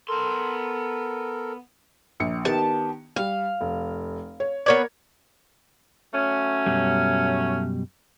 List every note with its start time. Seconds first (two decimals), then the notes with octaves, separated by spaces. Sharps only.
0.09 B3 A4 A#4 C6
2.20 A#1 C#7
2.45 D#3 B3 G4 A5
3.16 G3 F5
3.61 F1
4.40 C#5
4.66 B3 A#4 C#5 D5 G#6
6.14 F#3 A3 C#4
6.66 F#2 B2 G3